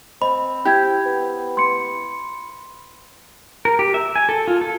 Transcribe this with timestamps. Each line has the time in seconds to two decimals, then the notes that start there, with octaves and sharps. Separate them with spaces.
0.22 C4 D#5 B5
0.65 E4 G4 G6 G#6
1.06 B3
1.57 C6 C#7
3.65 A#4
3.79 G4
3.94 E5
4.16 G#5
4.29 A4
4.48 F4
4.61 A4